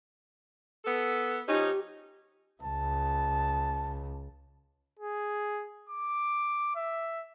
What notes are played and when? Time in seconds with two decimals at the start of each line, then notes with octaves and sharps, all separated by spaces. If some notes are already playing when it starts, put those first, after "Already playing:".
0.85 B3 A4
1.48 F3 C#4 D#4 G4
2.63 C#2 A5
5.00 G#4
5.90 D6
6.76 E5